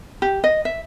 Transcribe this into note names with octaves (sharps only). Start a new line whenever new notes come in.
G4
D#5
E5